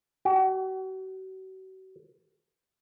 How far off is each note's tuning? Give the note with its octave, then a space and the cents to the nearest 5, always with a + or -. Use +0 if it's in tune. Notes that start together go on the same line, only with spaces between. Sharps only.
F#4 +40